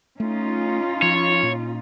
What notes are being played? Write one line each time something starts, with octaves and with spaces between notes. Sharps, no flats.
A3 C#4 D#4 F4
F3 C#5
A#2